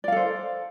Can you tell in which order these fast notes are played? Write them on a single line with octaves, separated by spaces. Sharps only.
D5 F5 A4 C5